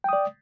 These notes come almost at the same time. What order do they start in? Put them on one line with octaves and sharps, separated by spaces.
G5 D#6 D5